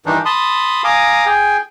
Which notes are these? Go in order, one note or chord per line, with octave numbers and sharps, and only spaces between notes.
G2 D#3 E3 D4 D#4
A5 B5 C6 D#6
F5 G#5 A#5 D6 D#6
G#4 G5 G#5